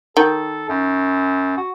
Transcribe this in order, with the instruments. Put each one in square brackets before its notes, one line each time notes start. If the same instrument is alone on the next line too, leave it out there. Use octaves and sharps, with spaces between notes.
[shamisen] D#3 [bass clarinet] A4
[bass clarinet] F#2
F#4